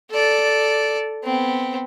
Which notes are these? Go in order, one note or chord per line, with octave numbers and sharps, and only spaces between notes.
A4 D5
B3 C4